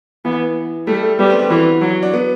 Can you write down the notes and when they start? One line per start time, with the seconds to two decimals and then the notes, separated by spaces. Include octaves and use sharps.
0.25 E3 B3
0.87 G3 A3
1.03 A3
1.19 G3 B3
1.30 C4
1.39 D4
1.50 E3 F#4
1.81 F#3 F#4
2.02 D4
2.14 B3